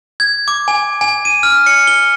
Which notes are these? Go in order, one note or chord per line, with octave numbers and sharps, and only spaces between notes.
G#6
D6
G#5
G#5
D#7
F6
C#7
G7